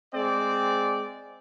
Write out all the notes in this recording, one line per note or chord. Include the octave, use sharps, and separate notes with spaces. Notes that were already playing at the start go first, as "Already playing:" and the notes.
G#3 C4 G#4 D5